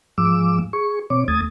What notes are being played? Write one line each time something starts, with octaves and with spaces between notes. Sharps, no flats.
G#2 F3 G#3 D6 E6
G#4 C#6
B2 C4 C#5 D6
D#2 A3 D#6 G#6 A6